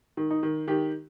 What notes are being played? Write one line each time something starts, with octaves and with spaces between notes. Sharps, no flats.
D#3
D#4
D#3
D#3 G4